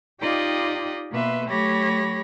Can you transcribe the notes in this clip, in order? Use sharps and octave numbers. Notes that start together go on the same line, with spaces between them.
D#4 F4 G4 D5 D#5 G5
B2 A#3 B4 E5 C6
F#3 A3 G4 C#5 B5 A#6